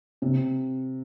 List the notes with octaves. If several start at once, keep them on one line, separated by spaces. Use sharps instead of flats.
C3